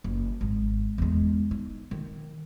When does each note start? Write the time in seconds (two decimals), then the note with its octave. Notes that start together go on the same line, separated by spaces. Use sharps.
0.04 F#1
0.41 G#1
0.98 E2 G#3
1.51 D#4
1.91 D#3